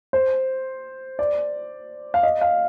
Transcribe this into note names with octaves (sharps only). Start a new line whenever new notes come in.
C5
D5
F5
D#5
F5